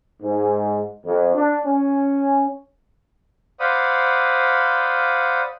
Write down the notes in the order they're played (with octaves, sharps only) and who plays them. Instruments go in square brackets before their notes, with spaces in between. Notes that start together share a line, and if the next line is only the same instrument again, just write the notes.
[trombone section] G#2
F2
D4
C#4
[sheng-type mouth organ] C5 D5 F5 F#5 B5 D#6